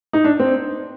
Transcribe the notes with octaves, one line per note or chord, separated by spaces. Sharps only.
D#4
D4
C4